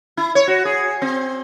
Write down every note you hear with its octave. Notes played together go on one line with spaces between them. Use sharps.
E4
C#5
F#4
G#4
C4